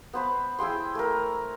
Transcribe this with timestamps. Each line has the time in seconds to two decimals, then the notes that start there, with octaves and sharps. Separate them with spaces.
0.13 B3 C5 B5
0.59 E4 G#4 G5 C6
0.95 A3 A#4